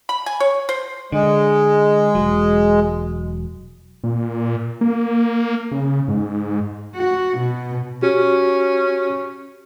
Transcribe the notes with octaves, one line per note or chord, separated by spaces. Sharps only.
B5
G#5
C#5
C5
D3 G#3
E1 B1 F#3
A#2
A#3
C#3
G#2
F#4
B2
C#4 F#4 G4